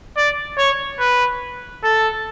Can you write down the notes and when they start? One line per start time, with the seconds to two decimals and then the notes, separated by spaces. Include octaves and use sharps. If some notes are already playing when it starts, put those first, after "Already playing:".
0.17 D5
0.58 C#5
0.99 B4
1.84 A4